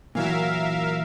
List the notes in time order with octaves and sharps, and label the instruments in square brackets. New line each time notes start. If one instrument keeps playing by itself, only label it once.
[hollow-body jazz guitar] A#2 E3 F#3 [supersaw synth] A#4 E5 F5